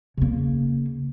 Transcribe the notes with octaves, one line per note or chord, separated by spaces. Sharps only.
C#3 A#3